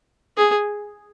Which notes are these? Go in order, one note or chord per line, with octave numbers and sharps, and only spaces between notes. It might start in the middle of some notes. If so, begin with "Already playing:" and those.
G#4